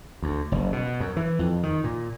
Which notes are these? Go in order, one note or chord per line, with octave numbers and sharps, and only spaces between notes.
D2
F#1
B2
F#2
E3
F2
D#3
A#2